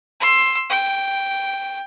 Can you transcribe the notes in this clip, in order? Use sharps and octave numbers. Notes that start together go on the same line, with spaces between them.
C6 E6
G5